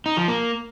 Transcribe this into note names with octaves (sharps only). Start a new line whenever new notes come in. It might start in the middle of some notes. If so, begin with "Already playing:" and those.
D#4
F3
A#3